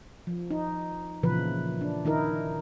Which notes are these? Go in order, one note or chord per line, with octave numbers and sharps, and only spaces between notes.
F3
D#4
A#2 C#3 E3 F3 B4
D4
D#3 D#4 E4 A#4